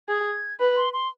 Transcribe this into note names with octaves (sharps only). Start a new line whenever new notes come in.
G#4 G#6
B4
C6
C6